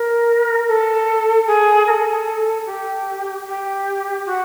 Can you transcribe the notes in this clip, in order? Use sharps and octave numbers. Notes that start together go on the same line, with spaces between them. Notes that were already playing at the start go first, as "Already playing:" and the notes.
Already playing: A#4
A4
G#4
A#4
A4
G4
G4
F#4